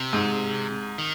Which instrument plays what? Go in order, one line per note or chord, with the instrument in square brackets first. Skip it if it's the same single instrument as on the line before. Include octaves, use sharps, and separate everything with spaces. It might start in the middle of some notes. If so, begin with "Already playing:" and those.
Already playing: [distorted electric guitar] C3
[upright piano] G#2
[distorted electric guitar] D#3